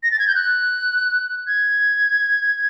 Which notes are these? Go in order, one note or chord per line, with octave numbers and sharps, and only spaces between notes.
A#6
A6
G#6
G6
F#6
G#6